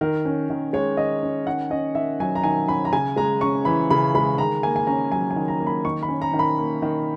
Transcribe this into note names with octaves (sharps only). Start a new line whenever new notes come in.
D#3 A#4
C#4
D#3
G#3 C#5
D#3 D#5
C#4
D#3 F#5
C#4 D#5
D#3 E5
F#3 G#5
A#5
D#3 G#5
C#4 B5
A#5
C#3 G#5
G#3 A#5
C#4 C#6
E3 B5
C#3 B5
G#3 B5
D#3 A#5
A#3 G#5
G#5
C#4 A#5
F#3 G#5
G#5
D#3
A#5
A#3
B5
D#3 C#6
B5
C#4
A#5
D#3
B5
A#3
D#3